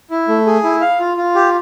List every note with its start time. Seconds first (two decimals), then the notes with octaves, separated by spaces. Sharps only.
0.11 E4
0.28 A3
0.46 G#4
0.64 E4
0.81 F5
0.99 F4
1.17 F4
1.35 G4